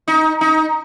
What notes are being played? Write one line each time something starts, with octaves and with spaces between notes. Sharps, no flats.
D#4
D#4